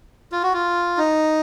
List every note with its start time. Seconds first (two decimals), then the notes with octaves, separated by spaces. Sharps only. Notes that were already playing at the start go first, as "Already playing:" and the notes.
0.32 F4
0.43 F#4
0.53 F4
0.97 D#4